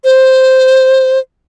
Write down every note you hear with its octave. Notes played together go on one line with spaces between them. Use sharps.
C5